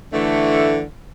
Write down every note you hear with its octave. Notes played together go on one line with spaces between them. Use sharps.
D3 E3 A3